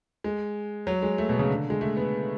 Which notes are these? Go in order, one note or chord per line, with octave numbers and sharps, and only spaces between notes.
G#3
F#3
G#3
A3
B2
C#3
D3
G#3
A3
B3